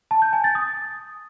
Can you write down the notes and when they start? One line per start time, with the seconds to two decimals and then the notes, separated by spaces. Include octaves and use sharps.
0.11 A5
0.22 G6
0.33 G#5
0.44 A6
0.55 D#6